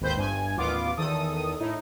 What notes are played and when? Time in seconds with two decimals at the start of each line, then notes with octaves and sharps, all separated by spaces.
0.01 G#1 D#2 C4 B4 C5 G6
0.15 G1 G2 G#5
0.56 A1 D#2 B3 F4 D6
0.97 E2 D#3 A4 D#6
1.60 A2 D#4 E4